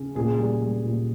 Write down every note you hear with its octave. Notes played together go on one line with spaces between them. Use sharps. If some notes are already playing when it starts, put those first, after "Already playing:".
Already playing: C#3
A#2 G#4
G3
G3
A#2